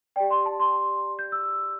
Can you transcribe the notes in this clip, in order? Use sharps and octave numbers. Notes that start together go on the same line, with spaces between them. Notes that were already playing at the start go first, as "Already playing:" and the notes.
G4 D5 G5
C6
A5
C6
G6
E6